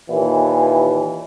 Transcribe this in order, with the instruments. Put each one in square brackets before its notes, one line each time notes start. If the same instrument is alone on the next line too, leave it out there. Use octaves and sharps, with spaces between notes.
[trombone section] D#2 A#2 E3